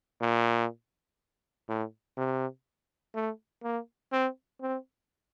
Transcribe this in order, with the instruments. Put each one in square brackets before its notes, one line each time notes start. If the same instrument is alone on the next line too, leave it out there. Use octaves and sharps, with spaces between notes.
[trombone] A#2
A2
C3
A3
A#3
C4
C4